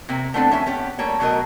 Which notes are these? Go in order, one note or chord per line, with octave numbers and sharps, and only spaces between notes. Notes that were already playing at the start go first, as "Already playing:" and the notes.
C3 A#3 C4
A3 B3 C4 D4 G#4 A4
F3 C#4 E5
B3 C#4 G4
G3 A3 A#3 C#5
B2 F#3 A3 A#4 D#5